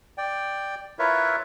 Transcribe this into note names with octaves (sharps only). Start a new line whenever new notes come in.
D5 G5
E4 F4 A#4 B4 C#5 E5